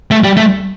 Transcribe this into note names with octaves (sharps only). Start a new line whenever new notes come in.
A3
G3
A3